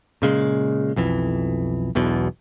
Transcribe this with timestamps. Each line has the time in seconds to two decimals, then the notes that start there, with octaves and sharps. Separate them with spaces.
0.22 A#2 C#3 G#3
0.96 B1 F2 E3
1.95 E1 B1 E2 B2